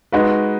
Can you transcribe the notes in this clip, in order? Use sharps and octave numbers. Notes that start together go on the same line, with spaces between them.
G#3 D#4 F#4 B4